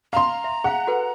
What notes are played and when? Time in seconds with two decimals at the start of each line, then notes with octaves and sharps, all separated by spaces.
0.13 F5 A#5 C6
0.44 E5
0.64 G#4 F5 F#5
0.87 F#4 A4 B4